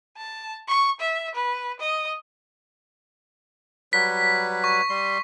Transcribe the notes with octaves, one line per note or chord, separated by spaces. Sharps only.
A5
C#6
E5
B4
D#5
F#3 G3 B4 B6
C#6
G3 C6